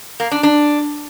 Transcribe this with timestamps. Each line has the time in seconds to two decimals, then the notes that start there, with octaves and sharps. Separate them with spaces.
0.20 A#3
0.32 D4
0.43 D4